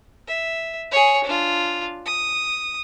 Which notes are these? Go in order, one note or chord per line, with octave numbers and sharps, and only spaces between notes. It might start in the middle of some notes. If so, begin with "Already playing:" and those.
E5
G#4 C#5
D4 F4
D#6